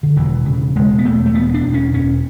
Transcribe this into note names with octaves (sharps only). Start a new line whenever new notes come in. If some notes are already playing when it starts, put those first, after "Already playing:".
D3
E1 E3
C#3
E1 G#3
B3
E1 A3
A3
E1 B3
D4
E1
C#4
E1 C#4